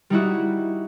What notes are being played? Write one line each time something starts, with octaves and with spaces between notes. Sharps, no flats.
G3 D#4 E4 F#4